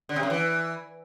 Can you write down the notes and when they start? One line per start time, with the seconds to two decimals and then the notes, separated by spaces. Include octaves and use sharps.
0.09 D3
0.16 C3
0.23 F#2
0.30 E3